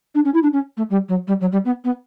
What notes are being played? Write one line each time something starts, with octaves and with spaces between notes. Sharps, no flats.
D4
C#4
E4
D4
C#4
A3
G3
F#3
G3
F#3
G3
B3
B3